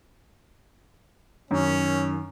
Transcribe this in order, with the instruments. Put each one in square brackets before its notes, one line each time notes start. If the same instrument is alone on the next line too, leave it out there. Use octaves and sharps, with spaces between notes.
[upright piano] F#2 [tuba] D#3 [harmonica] C#4